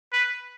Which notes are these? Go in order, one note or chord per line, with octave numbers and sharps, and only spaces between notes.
B4